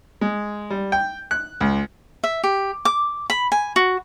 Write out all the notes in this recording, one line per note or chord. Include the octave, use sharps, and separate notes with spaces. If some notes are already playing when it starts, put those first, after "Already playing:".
G#3
G3
G5
F#6
C#2
E5
G4
D6
B5
G#5
F#4